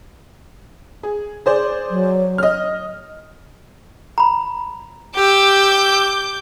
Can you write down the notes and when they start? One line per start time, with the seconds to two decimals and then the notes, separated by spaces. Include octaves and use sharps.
1.03 G#4
1.46 G#4 C5 D5
1.90 F#3
2.38 D#5 F6
4.18 A#5 B5
5.15 G4 D6 E6 G6